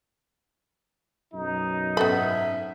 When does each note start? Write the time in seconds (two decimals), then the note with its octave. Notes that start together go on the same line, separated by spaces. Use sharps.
1.34 B1 F#2 D#4
1.97 G#2 B3 C#4 A4 E5 B5